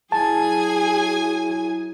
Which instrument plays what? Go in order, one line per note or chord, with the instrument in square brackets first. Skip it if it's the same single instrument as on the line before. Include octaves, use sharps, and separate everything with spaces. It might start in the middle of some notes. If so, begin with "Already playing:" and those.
[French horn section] F#3 E4 [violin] G#4 G#5 [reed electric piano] A5